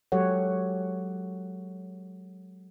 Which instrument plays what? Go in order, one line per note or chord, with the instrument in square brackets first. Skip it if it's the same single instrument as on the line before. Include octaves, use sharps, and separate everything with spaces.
[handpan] F#3 G#3 G4 A4 C#5 F#5